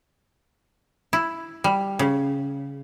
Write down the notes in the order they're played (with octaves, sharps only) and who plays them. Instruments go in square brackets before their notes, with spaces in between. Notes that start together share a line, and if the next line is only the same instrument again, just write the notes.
[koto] E4
G3
C#3